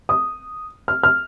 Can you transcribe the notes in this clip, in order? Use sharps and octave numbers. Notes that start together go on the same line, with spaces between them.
D#6
F6
F6